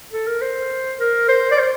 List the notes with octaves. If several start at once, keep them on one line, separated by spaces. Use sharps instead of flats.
A4
A#4
C5
A#4
C5
D5
C5